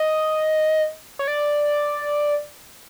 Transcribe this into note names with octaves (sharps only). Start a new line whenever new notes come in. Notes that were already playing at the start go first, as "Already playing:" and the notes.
Already playing: D#5
C#5
D5